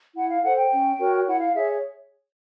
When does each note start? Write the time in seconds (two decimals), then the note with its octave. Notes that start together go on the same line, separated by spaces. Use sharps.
0.15 E4 F#5
0.29 F5
0.42 A4 C5 F#5
0.57 G5
0.70 C#4
0.99 F#4 A#4 C#5
1.27 E4 F#5
1.41 F5
1.55 G#4 C#5 E5